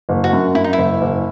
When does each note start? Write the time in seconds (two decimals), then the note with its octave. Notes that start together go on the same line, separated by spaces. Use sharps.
0.09 F#1
0.24 F#4
0.33 F#2
0.55 F#2 E4
0.64 D#4
0.73 F#1 E4
1.01 F#1